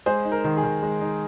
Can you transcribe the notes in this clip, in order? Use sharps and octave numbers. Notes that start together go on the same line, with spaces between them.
G#3 G#4 C5
D#4
A#4
D#3
G#4
D#3
G#3
D#4